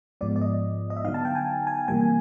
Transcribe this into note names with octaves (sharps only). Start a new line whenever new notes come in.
G#2 F3 G#3 B3 D5
D5
D#5
D#5
E5
D3 F#3 B3 D#4 F5
A5
G5
G#5
G#5
C3 E3 G3 A#3 G#5